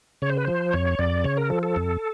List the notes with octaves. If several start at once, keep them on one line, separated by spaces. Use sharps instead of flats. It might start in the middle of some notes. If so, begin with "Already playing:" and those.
C#3 C#5
C5
B4
F3 C5
F2 C#5
F2 D5
C#3 C#5
A#4
F3 A4
A4
F2